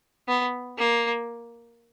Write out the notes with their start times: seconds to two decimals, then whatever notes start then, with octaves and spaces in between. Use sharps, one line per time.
0.28 B3
0.78 A#3